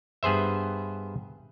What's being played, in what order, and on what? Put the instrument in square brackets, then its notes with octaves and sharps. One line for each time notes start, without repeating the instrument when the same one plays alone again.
[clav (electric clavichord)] G2 B3 G#4 C5 E5